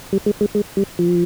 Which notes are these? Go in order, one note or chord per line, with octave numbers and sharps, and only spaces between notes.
G3
G#3
G#3
G#3
G3
F3